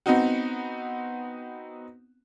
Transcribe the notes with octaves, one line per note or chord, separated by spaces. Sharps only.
B3 C4 D#4 F#4